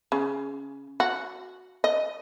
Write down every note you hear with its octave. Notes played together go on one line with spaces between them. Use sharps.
C#3
F#4
D#5